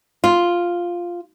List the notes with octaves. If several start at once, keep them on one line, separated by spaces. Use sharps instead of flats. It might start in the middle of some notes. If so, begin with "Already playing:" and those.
F4